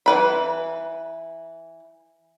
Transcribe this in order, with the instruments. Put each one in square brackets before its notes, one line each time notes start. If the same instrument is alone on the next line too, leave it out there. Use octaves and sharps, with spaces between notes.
[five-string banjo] E3 B4 B5